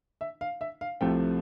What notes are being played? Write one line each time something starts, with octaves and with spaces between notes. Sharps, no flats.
E5
F5
E5
F5
C2 C3 F3 A3 G5